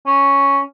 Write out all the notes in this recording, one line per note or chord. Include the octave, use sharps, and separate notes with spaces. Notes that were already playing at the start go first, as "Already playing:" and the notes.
C#4